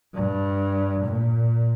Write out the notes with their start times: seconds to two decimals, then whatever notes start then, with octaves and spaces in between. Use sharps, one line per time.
0.15 G2
1.05 A#2